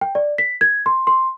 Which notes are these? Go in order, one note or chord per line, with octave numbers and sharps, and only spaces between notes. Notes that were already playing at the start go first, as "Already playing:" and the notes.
G5
D5
B6
G#6
C6
C6